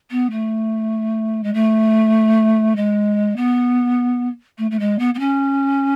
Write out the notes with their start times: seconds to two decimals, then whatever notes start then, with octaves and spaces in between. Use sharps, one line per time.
0.11 B3
0.31 A3
1.44 G#3
1.54 A3
2.76 G#3
3.36 B3
4.58 A3
4.71 A3
4.80 G#3
4.99 B3
5.14 B3
5.19 C#4